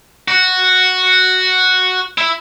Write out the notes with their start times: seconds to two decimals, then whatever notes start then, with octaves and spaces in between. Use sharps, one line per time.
0.28 F#4
2.18 E4